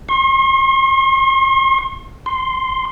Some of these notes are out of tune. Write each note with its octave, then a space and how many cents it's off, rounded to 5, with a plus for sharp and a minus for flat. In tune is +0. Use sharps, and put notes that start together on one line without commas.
C6 +45
C6 +0